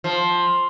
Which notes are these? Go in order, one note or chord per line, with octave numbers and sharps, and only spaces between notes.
F3